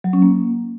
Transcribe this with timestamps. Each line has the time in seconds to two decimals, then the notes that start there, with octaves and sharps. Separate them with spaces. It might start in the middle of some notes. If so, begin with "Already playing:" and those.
0.04 F#3
0.13 C#4
0.22 A#3